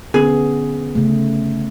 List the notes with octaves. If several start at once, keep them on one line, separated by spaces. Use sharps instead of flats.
D3 B3 C#4 G#4
C#3 A3